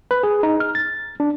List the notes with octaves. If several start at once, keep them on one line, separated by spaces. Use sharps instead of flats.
B4
G#4
D#4
F6
A6
D4